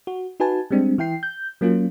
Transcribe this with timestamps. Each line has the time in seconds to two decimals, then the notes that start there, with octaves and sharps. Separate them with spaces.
0.07 F#4
0.40 D#4 F#4 B4 G#5 A5
0.71 G3 G#3 C4 D4
0.98 E3 E4 G5 C7
1.23 G6
1.61 F#3 A#3 C#4 F4